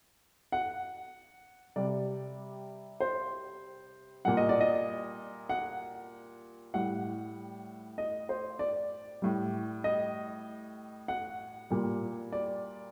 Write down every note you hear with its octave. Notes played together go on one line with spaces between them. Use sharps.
F#5
C3 G3 D5
C5
A#2 G3 F#5
D#5
D5
D#5
F#5
A2 G3 F#5
D#5
C5
D5
A2 G3
D#5
F#5
A#2 G3
D5